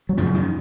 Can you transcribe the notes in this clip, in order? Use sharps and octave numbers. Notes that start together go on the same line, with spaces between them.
F#3
F#2 C#3 F3
D#3